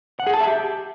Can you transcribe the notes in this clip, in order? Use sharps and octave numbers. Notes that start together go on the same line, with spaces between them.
F#5
G#4
A5
E5
G4